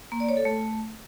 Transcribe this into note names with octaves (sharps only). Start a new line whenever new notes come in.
A#3
D5
C#5
A4
A3